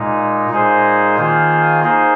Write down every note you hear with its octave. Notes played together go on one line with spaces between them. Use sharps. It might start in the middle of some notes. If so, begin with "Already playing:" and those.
Already playing: A#2 G#3 D#4
A#2 G#3 D#4 G#4 C5
D#3 A#3 F4 G#4 C5
A#3 D#4 G#4 C5